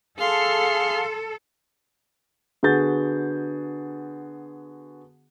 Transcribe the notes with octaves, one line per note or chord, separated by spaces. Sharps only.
G#4 A4 F5 C6 F6
D3 B3 F#4 G#4 G6 A6